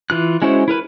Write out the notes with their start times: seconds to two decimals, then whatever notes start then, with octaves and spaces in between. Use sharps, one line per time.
0.10 E3 F4 F#6
0.42 G#3 C#4 E4 F#4 C5
0.68 E4 A#4 B4 B5